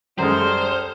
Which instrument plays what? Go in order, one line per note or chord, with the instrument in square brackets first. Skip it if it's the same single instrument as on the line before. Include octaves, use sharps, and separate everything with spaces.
[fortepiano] F#2 G#3 [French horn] G3 [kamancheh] A4 F6 [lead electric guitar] C5